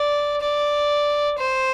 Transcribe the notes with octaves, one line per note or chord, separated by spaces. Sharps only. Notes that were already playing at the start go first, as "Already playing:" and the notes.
Already playing: D5
D5
C5